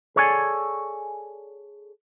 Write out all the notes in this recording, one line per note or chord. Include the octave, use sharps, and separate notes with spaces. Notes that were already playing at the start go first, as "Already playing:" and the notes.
G#4 A4 C#5 D5 F5 G#5